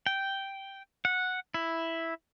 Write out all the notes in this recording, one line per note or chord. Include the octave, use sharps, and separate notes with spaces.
G5
F#5
E4